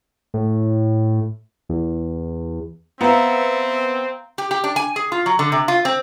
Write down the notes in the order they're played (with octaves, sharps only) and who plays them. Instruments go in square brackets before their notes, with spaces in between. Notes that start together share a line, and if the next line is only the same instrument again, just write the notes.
[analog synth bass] A2
E2
[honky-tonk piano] B3 [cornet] C4 [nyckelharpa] E5 [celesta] F5 A#5
[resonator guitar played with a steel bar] G4
G4
D4
G#5
G#4
F4
F#3
D3
C3
F4
C4